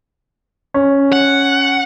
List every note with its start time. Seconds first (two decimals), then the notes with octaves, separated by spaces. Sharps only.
0.74 C#4
1.12 F#5